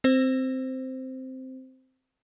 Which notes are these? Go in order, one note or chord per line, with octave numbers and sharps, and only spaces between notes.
C4 C5